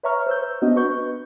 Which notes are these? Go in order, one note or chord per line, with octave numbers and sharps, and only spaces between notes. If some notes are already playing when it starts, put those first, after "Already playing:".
B4 C#5 E5 A#5 C#6 F6
C5 E6 G6
B3 D4 F#4 D#5
B4 C#6 G6